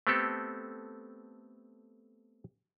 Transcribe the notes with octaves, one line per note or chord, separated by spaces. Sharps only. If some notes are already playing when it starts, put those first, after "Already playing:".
A3 B3 C4 G4 A4